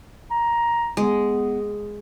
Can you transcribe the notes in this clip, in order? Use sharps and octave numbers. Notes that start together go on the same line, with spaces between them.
A#5
G#3 B3